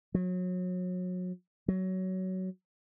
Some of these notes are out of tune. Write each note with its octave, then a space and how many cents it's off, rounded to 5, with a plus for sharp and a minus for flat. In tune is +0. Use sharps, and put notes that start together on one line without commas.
F#3 -30
F#3 +15